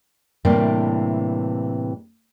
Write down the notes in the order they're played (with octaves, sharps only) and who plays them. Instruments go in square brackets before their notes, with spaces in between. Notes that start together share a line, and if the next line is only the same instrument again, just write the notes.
[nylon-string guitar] A2 C3 E3 G3 A#3 D4